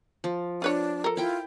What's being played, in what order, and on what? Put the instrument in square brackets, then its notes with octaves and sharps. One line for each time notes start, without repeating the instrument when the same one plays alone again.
[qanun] F3
[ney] D4 [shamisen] F4 B4 C#5
[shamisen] A4 A#4
[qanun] E4 G5 [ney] F4